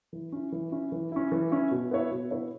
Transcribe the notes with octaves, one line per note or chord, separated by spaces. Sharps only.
E3
C#4 E4
E3
C#4 E4
E3
C#4 E4
E3
C#4 E4
B2
B3 E4 C#5 E5
B2
B3 E4 C#5 E5